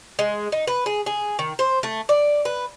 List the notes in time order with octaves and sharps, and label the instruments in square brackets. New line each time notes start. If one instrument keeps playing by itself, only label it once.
[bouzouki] G#3
D#4
B4
G#4
G#4
D#3
C5
A3
D5
B4